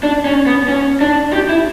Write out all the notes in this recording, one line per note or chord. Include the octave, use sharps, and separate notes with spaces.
D4
C#4
B3
C#4
D4
G4
E4